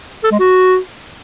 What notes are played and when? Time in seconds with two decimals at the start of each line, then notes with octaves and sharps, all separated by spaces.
0.24 A4
0.32 G#3
0.40 F#4